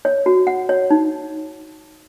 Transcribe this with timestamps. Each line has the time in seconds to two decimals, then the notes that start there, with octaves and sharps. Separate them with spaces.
0.05 C#5
0.26 F#4
0.47 F#5
0.69 C#5
0.91 D#4